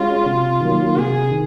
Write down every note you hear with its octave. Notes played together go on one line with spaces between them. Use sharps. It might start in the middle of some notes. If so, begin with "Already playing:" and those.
Already playing: G#3 C#4 F4 F#4
C3
D#3 F#3 A#3
C3 G#4
D#3